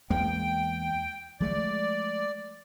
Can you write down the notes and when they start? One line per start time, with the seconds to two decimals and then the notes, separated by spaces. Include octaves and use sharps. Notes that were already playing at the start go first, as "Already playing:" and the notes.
0.10 E2 G#3 A#3 G5
1.40 F3 G#3 A3 D5